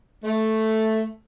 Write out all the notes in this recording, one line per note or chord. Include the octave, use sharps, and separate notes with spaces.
A3